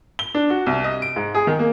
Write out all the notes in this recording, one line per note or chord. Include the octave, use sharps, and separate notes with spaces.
G7
D4
F#4
C2
D#5
D7
G#2
G#4
D#3
A#3